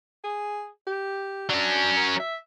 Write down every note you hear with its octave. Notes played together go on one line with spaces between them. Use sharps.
G#4
G4
F#3 C#4 D4
A#4
E5